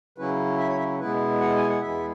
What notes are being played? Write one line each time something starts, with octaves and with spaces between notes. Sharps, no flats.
C#3 F#3 C#4 E4 B4
E5
C#5
E5
B2 G#3 B3 E4 B4
F#5
G#5
F#5
E2 E3 G#3 B3 E4 E5